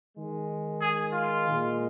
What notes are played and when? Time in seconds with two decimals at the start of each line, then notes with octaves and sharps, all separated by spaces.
0.15 D#3 G#3
0.80 G#4
1.12 F4
1.44 A#2 G#3